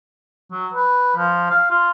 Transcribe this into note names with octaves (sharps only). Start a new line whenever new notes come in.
F#3
B4
F3
F5
F4